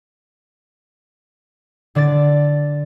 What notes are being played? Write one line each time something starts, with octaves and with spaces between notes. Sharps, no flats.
D3 D4 D5 A6